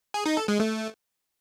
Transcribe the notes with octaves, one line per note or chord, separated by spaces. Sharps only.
G#4
D#4
A4
G#3
A3